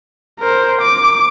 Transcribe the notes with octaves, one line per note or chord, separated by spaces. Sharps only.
A#4 C5
D6